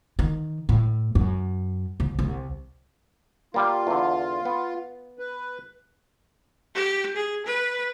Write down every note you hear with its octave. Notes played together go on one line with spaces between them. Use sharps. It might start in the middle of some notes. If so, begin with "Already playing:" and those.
D#3
A2
F#2
C2
C2
G3 A#3 F4
E2 D3
B3
B4
G4
G#4
B4